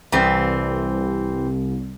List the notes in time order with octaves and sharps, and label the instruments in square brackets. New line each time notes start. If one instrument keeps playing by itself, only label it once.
[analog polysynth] C2 [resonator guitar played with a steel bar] E3 C4